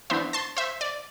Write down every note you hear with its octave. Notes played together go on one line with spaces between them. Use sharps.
E3 B3 D4 C5 E5
A5 C6
C5 E5
D5